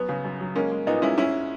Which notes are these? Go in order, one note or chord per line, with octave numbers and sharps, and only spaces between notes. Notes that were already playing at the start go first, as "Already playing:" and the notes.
Already playing: F#2 B3
C#3
F#2
F#3
G#3 A#3 C#4
G#3
A#2 B3 D#4
G#3 C#4 E4
G#2 C#4 E4